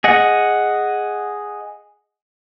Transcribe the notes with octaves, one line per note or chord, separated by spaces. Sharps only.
G#4 D#5 F#5